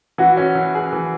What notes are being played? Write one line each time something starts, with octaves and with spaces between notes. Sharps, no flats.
E3 F#4
C#4
E3
G#4
E3